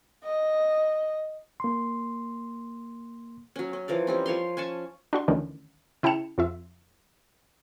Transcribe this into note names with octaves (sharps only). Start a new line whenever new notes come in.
D#5
A#3 C6
F#3 C#4
C#4
E3 F3 A#4 D5
G3 C4 C#4
F3 C#5 F5 C6
C#4 G#5 A5 C#6
D4 F#4 C6
D2 D#3 E3 C#4 D4
C#3 E4 G5 A5 C#7 E7
F2 F4 E5